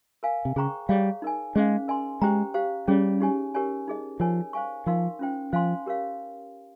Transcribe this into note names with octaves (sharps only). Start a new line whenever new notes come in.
A#4 F5 G#5
C3
C#3 G#4 C5 G5 A#5 C#6
G3 G#4 C#5 F5
D#4 A#4 D#5 G#5
G#3 C#4 G#4 C5 F5
A#4 D#5 G#5 C6
G#3 G4 C5 G5 A#5
G4 C5 F5
G3 C#4 G#4 C#5
D#4 G4 C#5 G#5
G4 A#4 C#5 G#5
D#4 G#4 D#5
F3 A#4 C#5 G#5
C5 F5 G#5 C#6
F3 D#4 A#4 F5 C6
C#4 F4 C5 G5
F3 C5 F5 G#5 C6
G4 A#4 C#5 F5